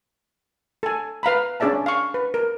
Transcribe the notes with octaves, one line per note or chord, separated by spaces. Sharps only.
A4 G#5
B4 F5 A#5 B5
C#4 D4 G#4 D5 E5 A5
F5 C#6
B4
A#4